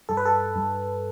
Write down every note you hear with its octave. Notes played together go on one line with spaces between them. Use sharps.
G2 A4
B4
A4
G2